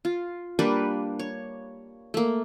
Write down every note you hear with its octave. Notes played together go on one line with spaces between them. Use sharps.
F4
G3 A#3 D4 B4
C#5
A3 A#3